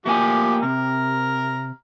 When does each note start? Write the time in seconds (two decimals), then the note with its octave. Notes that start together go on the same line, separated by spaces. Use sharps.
0.06 F3 A3 A#3 G4 G5 G#5
0.63 C3 A#5 F6